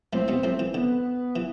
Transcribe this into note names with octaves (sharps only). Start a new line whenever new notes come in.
A2 A3 C4
B2 B3
A2 A3
E3
D3 B3
E3